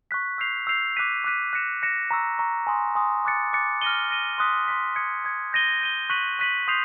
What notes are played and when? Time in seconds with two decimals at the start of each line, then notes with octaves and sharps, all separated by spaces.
0.11 C#6 F#6 B6
0.38 E6 G6 C7 F7
0.67 E6 G6 C7 F7
0.96 D6 F#6 B6 D#7
1.24 D6 F#6 B6 D#7
1.53 F#6 A#6 C#7 E7
1.82 F#6 A#6 C#7 E7
2.11 A#5 C#6 E6
2.39 A#5 C#6 E6
2.67 G#5 C6 D#6
2.95 G#5 C6 D#6
3.25 D6 F#6 A6 C#7
3.53 D6 F#6 A6 C#7
3.82 F6 A#6 D#7 G7
4.10 F6 A#6 D#7 G7
4.38 C6 D#6 F#6 B6
4.68 C6 D#6 F#6 B6
4.96 D#6 G#6 C#7
5.24 D#6 G#6 C#7
5.53 G6 A#6 D#7 G7
5.81 G6 A#6 D#7 G7
6.10 C#6 F#6 B6 D#7 F#7
6.39 C#6 F#6 B6 D#7 F#7
6.67 C6 D#6 G6 C7 F7